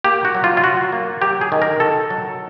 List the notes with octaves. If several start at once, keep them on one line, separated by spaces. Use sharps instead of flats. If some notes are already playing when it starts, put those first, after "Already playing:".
A#3 G4
F#4
F#3
F4
F4
F#3 F#4
A#3
F#3 G4
G#4
D#3
A#4
D#3 A4
F#3